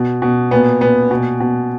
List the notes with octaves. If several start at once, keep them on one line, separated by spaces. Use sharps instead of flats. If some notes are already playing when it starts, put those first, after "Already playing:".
Already playing: B2
B2
A#2 B3
A#2 B3
B2
B2